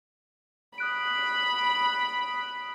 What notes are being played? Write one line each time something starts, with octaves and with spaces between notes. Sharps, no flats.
B5 D#6 F#6 D7